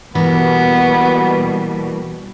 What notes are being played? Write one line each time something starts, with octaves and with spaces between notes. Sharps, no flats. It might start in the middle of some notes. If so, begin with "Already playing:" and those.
B2 E3 G3 A#3 B3